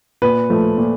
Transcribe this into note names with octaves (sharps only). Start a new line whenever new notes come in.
A#2 B4
F3 A3
A#2